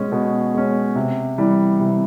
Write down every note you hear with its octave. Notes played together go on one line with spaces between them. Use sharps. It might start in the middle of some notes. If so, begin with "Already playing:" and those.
Already playing: B2 G#3 C#4
B2
G#3 C#4
C3
E3 G3
C3